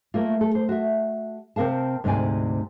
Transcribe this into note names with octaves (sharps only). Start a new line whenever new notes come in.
A3 A#3 F4
A4
C5
F#4 E5
C3 C4 A#4 F5 A5
D2 G#2 C3 D5 G#5